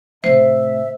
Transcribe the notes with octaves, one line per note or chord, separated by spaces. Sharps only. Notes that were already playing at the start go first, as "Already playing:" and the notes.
A2 C3 C5 E5